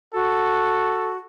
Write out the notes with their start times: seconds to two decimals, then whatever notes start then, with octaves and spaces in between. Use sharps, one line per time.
0.14 F#4 A4